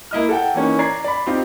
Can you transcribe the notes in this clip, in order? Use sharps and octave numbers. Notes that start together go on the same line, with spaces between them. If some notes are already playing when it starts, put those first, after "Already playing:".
A#3 E4 D#5 F6
A4 F#5 G5
E3 A#3 C#4 D#4
D5 A#5 G#6 C7
D5 B5
C4 D#4 F4 G4